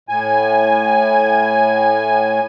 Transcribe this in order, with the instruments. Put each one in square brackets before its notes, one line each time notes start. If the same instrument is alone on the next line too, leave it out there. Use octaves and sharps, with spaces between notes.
[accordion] A2 G#5